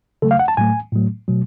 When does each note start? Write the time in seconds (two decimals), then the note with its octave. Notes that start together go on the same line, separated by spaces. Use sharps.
0.22 C#3 F#3 A3 A4
0.31 F5
0.39 F#5
0.48 A5
0.57 A2 F#3 A3 G#5
0.93 A2 F#3 A3
1.28 B2 F#3 A3